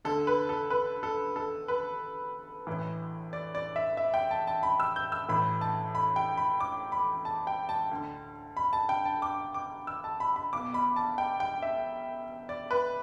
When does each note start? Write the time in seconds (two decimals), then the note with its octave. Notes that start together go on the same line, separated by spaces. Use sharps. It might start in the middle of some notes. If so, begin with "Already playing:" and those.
0.05 D2 D3 A4
0.27 B4
0.49 A4
0.70 B4
1.03 A4
1.36 A4
1.68 B4
2.67 A1 A2 E3
3.33 D5
3.55 D5
3.76 E5
3.97 E5
4.14 G5
4.31 A5
4.47 A5
4.63 B5
4.80 E6
4.96 G6
5.12 E6
5.29 A1 A2 E3 B5
5.61 A5
5.95 B5
6.16 G5
6.37 B5
6.60 D6
6.92 B5
7.25 A5
7.47 G5
7.69 A5
7.91 D2 D3
8.57 B5
8.73 A5
8.89 G5
9.05 A5
9.22 D6
9.54 D6
9.87 E6
10.04 A5
10.20 B5
10.36 B5
10.53 B1 B2 D6
10.74 B5
10.96 A5
11.18 G5
11.40 G5
11.62 E5
12.49 D5
12.71 B4